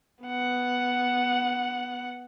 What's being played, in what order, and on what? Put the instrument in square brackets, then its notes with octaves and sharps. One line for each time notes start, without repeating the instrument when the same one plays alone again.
[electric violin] B3 F#5